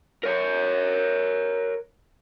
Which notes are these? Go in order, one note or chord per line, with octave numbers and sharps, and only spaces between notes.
A#4 C#5